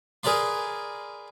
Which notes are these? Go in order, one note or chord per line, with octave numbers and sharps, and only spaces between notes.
G#4 A#4 B4 D5 C6